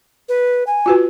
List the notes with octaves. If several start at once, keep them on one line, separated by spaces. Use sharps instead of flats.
B4
G#5
F4 F#4 B4